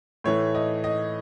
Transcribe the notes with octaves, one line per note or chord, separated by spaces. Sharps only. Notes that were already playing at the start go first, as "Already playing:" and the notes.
A2 E3 A3 C#5
D#5
D#5